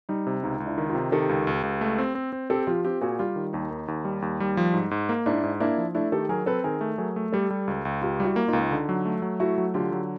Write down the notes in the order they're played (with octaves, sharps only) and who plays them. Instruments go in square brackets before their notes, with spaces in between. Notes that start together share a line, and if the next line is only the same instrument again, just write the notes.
[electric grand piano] G3 [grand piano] D#4
[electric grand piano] C3
[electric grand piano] C#2 [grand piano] D#4
[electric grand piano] C#2
[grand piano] D4 E4
[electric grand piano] D#3
[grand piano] D#4 F4
[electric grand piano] C3
[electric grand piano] D#3 [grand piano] G4 A4
[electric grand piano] C#2
C#2
C#2
A3
C4
C4
C4
[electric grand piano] C4 [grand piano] G4 A4
[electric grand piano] F3 [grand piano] F4 G4
[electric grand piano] C4 [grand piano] F4 G4
[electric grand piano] A#2 [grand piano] F#4 G#4
[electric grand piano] G3 [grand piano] F4 G4
[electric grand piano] D#3
[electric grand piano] D#2 [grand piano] D#4
[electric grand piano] D#2
D#2
G3
D#2
G3
F3
G#2
G#2
A#3
[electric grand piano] G#2 [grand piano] D4 E4
[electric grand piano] G#2
[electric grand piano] A#3 [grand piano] D4 E4
[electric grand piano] F3
[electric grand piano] A3 [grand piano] D4 E4
[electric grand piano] D#3 [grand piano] G4 A4
[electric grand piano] F#3 [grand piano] G#4 A#4
[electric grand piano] C4 [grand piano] A4 B4
[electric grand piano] D#3 [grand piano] G#4 A#4
[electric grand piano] A3
[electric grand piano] F#3 [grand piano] G#4 A#4
[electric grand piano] A3
[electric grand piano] G3 [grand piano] G4 A4
[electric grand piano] G3
C#2
C#2
[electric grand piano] C#2 [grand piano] F4 G4
[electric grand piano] G3 [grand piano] E4 F#4
[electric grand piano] A#3
[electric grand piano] C#2 [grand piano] D#4 F4
[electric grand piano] D3
F#3
A3
F#3
[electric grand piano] A3 [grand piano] E4 F#4
[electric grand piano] F#3
[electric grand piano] D3 [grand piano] F4 G4
[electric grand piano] F#3